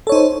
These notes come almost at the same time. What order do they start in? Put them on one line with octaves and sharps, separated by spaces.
A4 C#5 D#4 C5